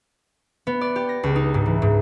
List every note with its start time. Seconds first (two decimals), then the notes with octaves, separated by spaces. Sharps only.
0.67 B3
0.81 D5
0.96 G4
1.09 A#6
1.23 C#2
1.36 D#4
1.54 G#2
1.66 E3
1.82 G#2